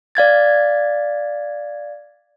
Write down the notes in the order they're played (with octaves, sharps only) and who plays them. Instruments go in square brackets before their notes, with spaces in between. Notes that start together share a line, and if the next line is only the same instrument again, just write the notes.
[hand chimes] D5 F5 G#6 A6